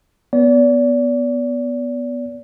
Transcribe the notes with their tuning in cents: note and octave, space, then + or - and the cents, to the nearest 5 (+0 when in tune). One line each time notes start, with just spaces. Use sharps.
B3 +0 D5 -35